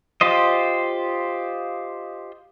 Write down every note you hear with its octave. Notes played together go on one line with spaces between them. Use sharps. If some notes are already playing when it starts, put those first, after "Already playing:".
F4 G4 C5 D#5